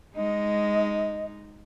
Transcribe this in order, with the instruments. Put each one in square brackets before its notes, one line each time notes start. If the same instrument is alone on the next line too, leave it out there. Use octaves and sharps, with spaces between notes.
[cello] G#3 D#4 [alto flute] D#5